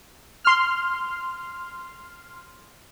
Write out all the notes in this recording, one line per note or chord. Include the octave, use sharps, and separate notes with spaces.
C6 F6